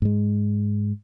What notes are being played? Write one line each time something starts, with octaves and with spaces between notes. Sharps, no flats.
G#2 G#3